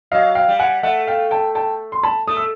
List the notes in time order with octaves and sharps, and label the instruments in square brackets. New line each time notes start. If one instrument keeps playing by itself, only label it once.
[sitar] F#3 [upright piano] D#5 F5
[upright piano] F5 G5
[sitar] G3
[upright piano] F#5 G#5
[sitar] A3 [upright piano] E5 F#5
[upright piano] F5 G5
G5 A5
G5 A5
C6
A5 B5
[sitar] A3 [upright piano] D#6
[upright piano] E6